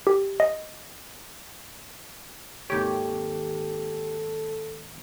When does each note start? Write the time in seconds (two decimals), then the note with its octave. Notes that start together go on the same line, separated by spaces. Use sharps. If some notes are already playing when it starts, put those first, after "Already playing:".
0.07 G4
0.40 D#5
2.70 G#1 D#2 G4 A4 C#5